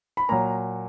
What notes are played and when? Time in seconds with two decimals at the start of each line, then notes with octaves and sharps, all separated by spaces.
0.17 B5
0.29 A#2 F#3 A#5